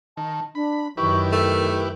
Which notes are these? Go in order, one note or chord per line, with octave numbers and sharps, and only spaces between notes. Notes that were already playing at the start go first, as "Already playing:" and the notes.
D#3 A5
D4 B5
F#2 D#3 E4 G4 B4 C#6
A3 A#4